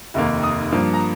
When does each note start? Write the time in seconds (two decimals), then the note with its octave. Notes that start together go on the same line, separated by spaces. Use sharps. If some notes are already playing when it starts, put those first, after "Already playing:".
0.14 F1 D#2 D#3 A#3
0.43 D#6
0.72 G2 F3 A#3
0.93 A#5